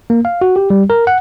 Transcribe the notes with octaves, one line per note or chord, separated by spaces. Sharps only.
A#3
F5
F#4
G4
G3
A#4
F#5